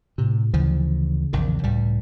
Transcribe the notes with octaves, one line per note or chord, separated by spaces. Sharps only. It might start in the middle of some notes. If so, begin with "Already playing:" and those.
A2 C3
D2 C#3 E3 F3
A#1 E2 D#3
C#2 A2 G3